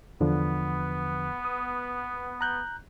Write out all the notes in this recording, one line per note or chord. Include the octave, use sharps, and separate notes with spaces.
E2 D3 F3 B3
D#6
A#5 F#6 G6